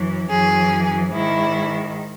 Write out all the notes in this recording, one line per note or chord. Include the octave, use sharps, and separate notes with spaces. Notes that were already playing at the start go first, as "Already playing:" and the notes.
Already playing: F#2 E3
F#2 E3 G#4
G#2 D#3 E4